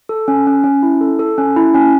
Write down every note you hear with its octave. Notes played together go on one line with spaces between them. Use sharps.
A4
C#4
C#4
C#4
E4
A4
A4
C#4
E4
C#4